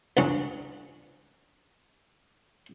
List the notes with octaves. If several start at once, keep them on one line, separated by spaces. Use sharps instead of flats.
C#2 G2 C#3 F#3 C#4